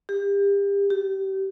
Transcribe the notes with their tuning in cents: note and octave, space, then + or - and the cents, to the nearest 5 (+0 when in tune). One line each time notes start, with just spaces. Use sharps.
G4 +35
G4 -25